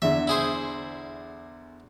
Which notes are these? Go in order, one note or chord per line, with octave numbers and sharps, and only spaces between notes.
E2 D3 E5
E4 G#4 C5